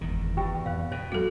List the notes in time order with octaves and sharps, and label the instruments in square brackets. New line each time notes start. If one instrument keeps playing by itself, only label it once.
[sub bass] F#1 [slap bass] E2 G#2 D#3
[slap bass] E2 [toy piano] E4 G4 G5
[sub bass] F2 [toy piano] C5 F5
[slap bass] B2 [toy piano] C5
[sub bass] F#3 [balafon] F#4 A4